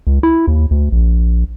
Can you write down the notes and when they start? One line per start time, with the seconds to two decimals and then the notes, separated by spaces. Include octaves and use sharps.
0.07 C#2
0.23 E4
0.47 D#2
0.71 D2
0.92 A#1